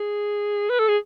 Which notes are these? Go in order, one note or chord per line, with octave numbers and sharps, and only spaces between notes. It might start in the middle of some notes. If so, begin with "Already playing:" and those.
Already playing: G#4
B4
A4
G#4